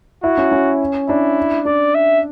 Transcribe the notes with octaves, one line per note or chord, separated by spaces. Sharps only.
E4 F#4
C#4
C#4
D4 E4
D4 D5
E5